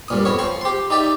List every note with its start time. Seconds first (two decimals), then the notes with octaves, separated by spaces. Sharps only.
0.08 G2 A#2 D#6
0.25 F2 B3 C#5
0.39 F3 C4 C#6
0.61 G4 C6
0.90 D#4 G4 D5 E5